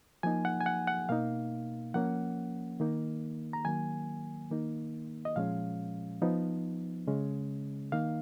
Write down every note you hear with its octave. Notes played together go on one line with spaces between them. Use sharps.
F3 A#3 D#4 G#5
F#5
G#5
F#5
F#5
B2 A#3 D#4 F5
F3 A#3 C#4 F#5
D#3 A#3 D#4
A#5
D#3 F#3 A#3 G#5
D#3 A#3 D#4
D#5
A#2 F3 G#3 C#4 F5
F3 B3 D#4
C#3 G#3 C#4
D#3 A#3 D#4 F5